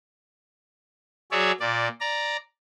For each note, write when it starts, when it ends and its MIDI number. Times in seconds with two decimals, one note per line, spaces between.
1.32 1.52 54
1.32 1.52 68
1.32 1.52 73
1.32 1.52 74
1.32 1.52 76
1.60 1.88 46
1.60 1.88 74
2.01 2.37 74
2.01 2.37 82